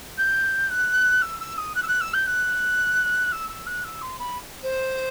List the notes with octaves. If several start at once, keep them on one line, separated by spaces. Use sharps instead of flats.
G6
F#6
E6
E6
D#6
F#6
E6
F#6
E6
G6
F#6
E6
E6
F#6
E6
C6
B5
C5